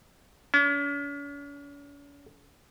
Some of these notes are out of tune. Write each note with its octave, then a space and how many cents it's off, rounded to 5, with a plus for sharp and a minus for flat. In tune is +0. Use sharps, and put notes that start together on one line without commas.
C#4 +45